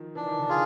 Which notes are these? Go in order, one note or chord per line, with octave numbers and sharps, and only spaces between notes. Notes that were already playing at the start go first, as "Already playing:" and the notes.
Already playing: D#3 F3
E3 D4
D#3
D3 E3
F4 G#4